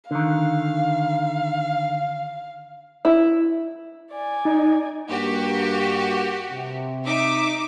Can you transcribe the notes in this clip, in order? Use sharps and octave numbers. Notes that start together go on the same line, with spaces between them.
D3 D#3 F5
E4
D5 G#5
D#4
G2 A#3 F#4 G4
C3
D#4 E5 D6